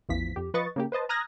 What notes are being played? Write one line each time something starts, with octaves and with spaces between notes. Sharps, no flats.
A1 E2 E3 F3 B6
F2 G4
F3 B4 D#5 C#6 A6
C#3 A#3 G4
B4 C5 D#5 A5
A#5 D#6 F6 F#6 G#6 A#6